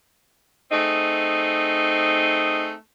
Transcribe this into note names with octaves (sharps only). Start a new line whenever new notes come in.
A3 C4 D#4 G#4